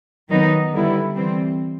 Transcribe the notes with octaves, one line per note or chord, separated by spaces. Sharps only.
D#3 F#3 B3 D#4
D3 G3 B3 E4
E3 G3 C4